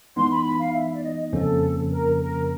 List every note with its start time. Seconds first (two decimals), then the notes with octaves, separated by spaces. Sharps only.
0.16 E3 G#3 B3 D#4 C6
0.31 B5
0.45 B5
0.60 F5
0.74 E5
0.94 D5
1.04 D#5
1.33 F2 C#3 F3 A#3 C#4 A4
1.91 A#4
2.20 A#4